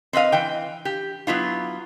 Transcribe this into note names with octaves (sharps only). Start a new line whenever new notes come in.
C4 B4 D#5 F5
E3 G5
G4
F#3 B3 E4 F4